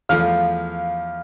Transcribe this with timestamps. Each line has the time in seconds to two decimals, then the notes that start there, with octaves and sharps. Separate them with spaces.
0.09 E2 F3 A3 F5